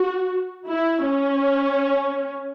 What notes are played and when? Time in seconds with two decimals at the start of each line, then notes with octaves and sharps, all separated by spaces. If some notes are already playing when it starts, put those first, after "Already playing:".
Already playing: F#4
0.67 E4
1.07 C#4